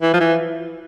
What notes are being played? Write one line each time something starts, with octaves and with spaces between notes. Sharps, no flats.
E3
F3
E3